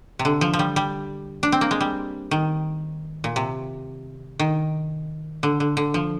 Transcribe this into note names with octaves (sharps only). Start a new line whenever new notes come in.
C3
D3
F3
F3
G3
G3
D4
C4
A#3
G#3
G3
D#3
A#2
C3
D#3
D3
D3
D3
F3